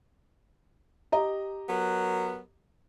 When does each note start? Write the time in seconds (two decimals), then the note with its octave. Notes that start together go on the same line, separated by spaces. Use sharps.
1.12 G4 D#5 A#5
1.69 F#3 B3 A#4